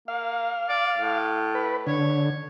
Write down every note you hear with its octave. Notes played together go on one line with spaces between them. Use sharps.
A#3 F5
D5
A2
B4
D3 C#5